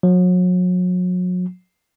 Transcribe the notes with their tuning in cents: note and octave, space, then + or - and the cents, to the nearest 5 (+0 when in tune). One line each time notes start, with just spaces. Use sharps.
F#3 -35